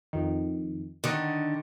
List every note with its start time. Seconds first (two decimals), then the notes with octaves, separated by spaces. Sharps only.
0.13 F2 D#3
1.04 D3 D#3 D#5 F#5